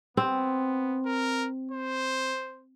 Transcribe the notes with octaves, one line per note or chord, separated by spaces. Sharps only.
B3 C4
A#4
C5